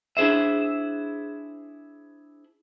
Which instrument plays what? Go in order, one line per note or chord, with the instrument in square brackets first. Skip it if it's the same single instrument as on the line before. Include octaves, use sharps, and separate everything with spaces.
[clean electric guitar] D4 E4 G#4 C5 E5